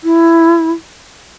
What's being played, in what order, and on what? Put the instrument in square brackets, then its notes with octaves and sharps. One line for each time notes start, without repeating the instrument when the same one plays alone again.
[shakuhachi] E4